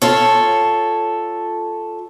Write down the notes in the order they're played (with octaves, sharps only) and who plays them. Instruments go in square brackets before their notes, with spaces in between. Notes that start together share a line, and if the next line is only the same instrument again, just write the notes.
[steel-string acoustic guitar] F4 A4 C#5